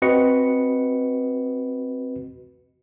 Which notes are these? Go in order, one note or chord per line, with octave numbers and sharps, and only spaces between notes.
C4 F#4 B4 D#5 C#7